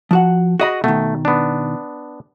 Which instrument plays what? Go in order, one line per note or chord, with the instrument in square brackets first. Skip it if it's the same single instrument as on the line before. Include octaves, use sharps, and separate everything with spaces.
[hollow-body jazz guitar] F3 F#4 F#5
[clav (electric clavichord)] F#4 [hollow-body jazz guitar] G#4 D#5 B5
[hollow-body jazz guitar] B2 D#3 [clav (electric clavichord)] A3
[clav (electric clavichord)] B3 D4